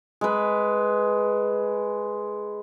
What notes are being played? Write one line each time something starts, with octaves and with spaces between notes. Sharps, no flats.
G#3 B4